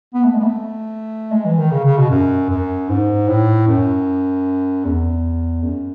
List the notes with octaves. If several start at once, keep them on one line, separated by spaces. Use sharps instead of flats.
B3
A3
G#3
B3
A3
G#3
E3
D#3
C#3
C#3
B2
F#2
F#2
G#2
A2
F#2
E2
F#2